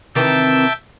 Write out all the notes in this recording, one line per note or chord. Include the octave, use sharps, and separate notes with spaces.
C3 D#3 E3 E5 G5 A5